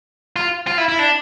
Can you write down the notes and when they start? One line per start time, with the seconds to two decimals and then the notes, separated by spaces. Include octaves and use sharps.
0.36 F4
0.67 F4
0.78 E4
0.89 E4
0.99 D4